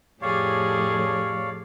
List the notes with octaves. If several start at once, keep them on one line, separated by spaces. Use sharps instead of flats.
F2 A2 G4 G#4 C#5 D5 F5